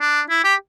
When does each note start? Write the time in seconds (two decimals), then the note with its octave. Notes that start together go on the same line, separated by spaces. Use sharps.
0.01 D4
0.30 E4
0.45 G4